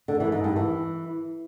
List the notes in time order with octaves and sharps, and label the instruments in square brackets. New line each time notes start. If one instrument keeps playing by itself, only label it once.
[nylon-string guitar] D3
E3
G#2
G2
E3